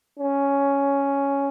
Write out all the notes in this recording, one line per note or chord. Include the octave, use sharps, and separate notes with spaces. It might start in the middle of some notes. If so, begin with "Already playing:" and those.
C#4